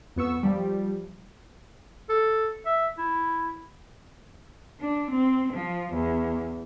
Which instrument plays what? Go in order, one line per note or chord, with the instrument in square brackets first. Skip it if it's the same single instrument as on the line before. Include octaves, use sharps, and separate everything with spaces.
[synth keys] F2 B3 C#6 E6
F3 G3
[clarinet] A4
E5
E4
[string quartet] D4
C4
F3
E2